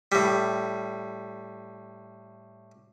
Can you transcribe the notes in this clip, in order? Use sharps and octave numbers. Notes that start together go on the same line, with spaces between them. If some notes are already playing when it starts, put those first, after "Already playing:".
A2 G3